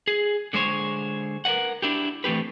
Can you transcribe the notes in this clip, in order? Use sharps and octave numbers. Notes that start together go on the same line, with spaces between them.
G#4
D3 G#3 C5 C#5
A#4 B4 D#5 F#5
D4 E4 G4
E3 A3 C4 G4 B4